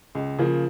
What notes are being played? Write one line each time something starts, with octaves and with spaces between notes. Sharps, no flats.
C#2
C#3 F3 A#3